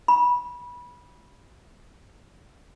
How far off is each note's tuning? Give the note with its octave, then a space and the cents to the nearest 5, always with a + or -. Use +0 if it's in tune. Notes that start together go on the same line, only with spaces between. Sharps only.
B5 -20